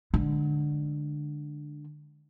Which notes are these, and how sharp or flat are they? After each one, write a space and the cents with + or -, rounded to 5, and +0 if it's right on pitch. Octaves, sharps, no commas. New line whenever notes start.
D3 +10 G#3 +15